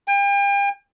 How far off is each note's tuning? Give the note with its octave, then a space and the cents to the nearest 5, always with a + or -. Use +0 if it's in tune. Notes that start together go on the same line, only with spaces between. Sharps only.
G5 +40